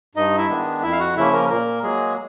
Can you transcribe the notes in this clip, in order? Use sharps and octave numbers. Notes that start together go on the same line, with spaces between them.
G2 D#4 D#5
E4 E5
D#3 G#3 B3 D4
F2 E4 E5
F5
F#4 F#5
C#3 F3 A#3 C#4 E4 E5
A#3 A#4
A#2 A#3 A#4
F#3 G#3 A#3 G#4